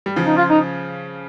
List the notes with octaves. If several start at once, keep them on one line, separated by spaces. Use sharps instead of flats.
G3
C#3 F3
D#4
F4
D#4